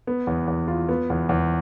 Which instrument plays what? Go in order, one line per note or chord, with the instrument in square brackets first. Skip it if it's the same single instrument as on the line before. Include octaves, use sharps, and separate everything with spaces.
[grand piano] B3
E2
E2
F4
B3
E2
E2